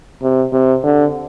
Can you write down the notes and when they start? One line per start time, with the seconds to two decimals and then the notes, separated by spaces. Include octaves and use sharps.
0.23 C3
0.53 C3
0.84 D3